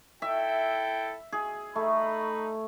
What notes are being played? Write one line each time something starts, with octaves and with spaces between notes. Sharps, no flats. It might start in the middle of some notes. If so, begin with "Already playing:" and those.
E4 A4 E5 G5
G#4
A3 D#4 B5